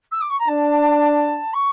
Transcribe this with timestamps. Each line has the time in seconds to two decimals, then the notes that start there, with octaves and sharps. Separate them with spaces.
0.11 E6
0.21 D6
0.29 C#6
0.39 A#5
0.48 D4 A5
1.53 C#6